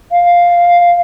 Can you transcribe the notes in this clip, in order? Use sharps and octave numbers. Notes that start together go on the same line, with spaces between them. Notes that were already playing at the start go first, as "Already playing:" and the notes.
F5